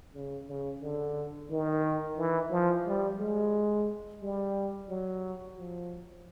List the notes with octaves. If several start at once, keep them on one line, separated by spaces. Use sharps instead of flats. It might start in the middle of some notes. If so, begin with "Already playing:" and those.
C#3
C#3
D3
D#3
E3
F3
G3
G#3
G3
F#3
F3